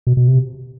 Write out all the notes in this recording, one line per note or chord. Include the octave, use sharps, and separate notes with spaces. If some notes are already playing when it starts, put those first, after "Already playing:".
B2
B2
C3